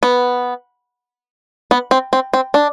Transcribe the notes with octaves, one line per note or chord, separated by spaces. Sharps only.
B3
B3
C4
C4
C4
D4